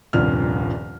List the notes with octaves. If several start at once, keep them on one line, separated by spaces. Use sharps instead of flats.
D#1 C2 G2 F3 F6